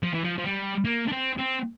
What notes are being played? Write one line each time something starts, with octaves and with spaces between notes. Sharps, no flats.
F3
E3
F3
F3
G3
A#3
D4
C4
C4